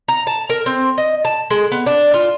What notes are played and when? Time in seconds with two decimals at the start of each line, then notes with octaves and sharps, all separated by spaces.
0.08 A#5
0.27 A5
0.50 A#4
0.66 C4
0.98 D#5
1.25 A5
1.50 G#3
1.72 B3
1.86 D4
2.14 F4